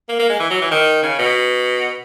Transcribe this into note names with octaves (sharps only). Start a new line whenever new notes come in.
A#3
A#3
G#3
E3
F#3
E3
D#3
C#3
B2